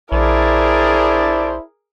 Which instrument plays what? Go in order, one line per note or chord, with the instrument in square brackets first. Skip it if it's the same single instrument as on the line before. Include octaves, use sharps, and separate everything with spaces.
[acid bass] A#1 [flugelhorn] E4 [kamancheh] G#4 A#4 [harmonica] C5 D5 A5